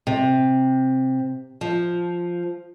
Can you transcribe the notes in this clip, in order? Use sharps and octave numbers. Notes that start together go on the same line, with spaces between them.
C3
F3